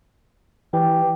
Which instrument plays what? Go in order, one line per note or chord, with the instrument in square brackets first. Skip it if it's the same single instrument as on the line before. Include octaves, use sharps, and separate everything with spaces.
[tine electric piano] E3 [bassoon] G4